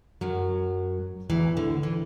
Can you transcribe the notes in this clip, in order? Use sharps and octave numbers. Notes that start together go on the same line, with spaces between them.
F#2 F#3
E2 E3
D2 D3
E3